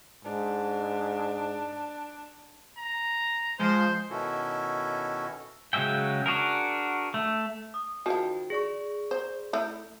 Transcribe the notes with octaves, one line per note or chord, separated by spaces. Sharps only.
G#2 D4
A#5
F3 G#3 C5
B2 D#3 C#4 E4 F#4 A4
C#3 F#3 G#3 E5 G5
D4 F#4 G#4 A#4
A3
D#6
D#3 F3 F#4 G5 A5
G#4 D5 C#6
C5
A3 E4